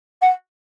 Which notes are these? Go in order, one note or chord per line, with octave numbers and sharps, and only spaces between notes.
F#5